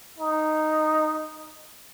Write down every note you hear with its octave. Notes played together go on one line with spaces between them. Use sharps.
D#4